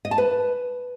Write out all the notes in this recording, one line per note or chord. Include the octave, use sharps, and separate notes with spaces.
D#5
A5
B4